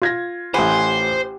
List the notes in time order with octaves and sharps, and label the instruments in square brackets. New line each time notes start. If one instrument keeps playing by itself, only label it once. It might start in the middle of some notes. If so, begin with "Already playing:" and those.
[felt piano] F4 G#6 A#6
[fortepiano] A1 B5 [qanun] G4 F#5 G#5 [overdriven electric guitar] C5